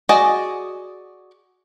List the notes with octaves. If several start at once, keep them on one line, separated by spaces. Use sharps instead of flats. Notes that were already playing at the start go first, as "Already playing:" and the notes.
F#4 G#4 D5 D#5